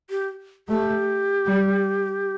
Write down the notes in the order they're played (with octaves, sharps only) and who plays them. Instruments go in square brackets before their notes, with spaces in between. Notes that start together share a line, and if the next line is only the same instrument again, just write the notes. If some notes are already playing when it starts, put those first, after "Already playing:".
[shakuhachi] G4
[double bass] A3 [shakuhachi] G4
[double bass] G3